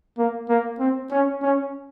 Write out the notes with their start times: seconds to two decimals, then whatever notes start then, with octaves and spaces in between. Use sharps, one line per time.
0.18 A#3
0.49 A#3
0.79 C4
1.11 C#4
1.42 C#4